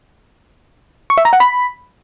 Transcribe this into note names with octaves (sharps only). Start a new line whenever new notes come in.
C#6
E5
A#5
F#5
B5